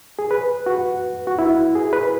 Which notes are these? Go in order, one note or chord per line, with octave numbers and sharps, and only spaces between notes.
G#4
B4
F#4
F#4
E4
G#4
B4